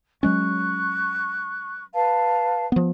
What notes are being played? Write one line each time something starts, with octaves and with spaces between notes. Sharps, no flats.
F#3 G#3 C#4 C#6 F#6
B4 F5 A5
F3 B3